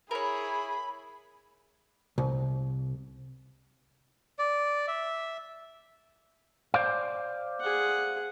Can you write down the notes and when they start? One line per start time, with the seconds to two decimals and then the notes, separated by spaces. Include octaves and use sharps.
0.11 E4 G#4 A#4 C#5 B5
2.18 C2
4.39 D5
4.88 E5
6.74 C5 D5 F5
7.61 G#4 F#5